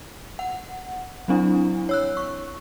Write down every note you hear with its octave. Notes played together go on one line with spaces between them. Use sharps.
F#5
F#3 C4 D4 E4
C#5 E6 F#6
C#6